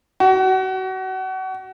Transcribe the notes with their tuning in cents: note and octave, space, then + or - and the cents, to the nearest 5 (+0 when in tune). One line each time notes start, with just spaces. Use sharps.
F#4 +30